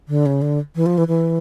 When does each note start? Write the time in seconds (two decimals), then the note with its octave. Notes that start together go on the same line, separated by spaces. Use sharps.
0.08 D3
0.26 C#3
0.42 D3
0.76 E3
0.86 F3
0.98 E3
1.08 E3